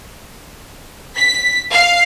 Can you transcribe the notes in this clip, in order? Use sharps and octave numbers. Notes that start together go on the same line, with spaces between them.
B6
F5